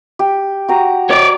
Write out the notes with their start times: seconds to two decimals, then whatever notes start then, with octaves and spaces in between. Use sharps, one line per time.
0.19 G4
0.68 F#4 G4 A#5
1.10 C#5 D5